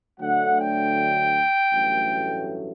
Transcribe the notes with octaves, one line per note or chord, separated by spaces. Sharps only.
D2 D3 F#3 A3 F#5
G5
A1 G2 F#3 A3